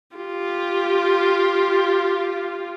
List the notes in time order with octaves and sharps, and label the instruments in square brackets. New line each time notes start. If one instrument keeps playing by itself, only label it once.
[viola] F4 G4